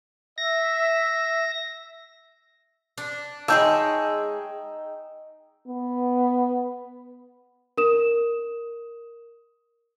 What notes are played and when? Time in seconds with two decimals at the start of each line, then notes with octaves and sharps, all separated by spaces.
0.38 E5 A#6
2.98 D4
3.48 G#3 D#4 G#4 C#5 G5 A5 E6 G6
5.68 B3
7.78 A#4 D#6 E7